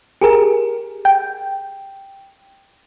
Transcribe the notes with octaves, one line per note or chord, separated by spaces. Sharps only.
G4 G#4 A#4
G5